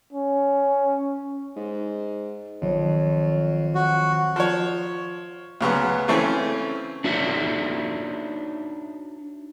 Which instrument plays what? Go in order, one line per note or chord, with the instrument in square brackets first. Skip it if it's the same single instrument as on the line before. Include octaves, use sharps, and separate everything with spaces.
[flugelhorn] C#4
[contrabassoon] G#2
[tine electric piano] A1 D#3 F#3 [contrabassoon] F2 [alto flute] C#5
[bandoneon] F#4
[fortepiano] F3 C#5
D2 C#3 F#3 B3
C#3 E3 A3 C4 C#4
[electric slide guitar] D4 D#4 F#4 C#5 E5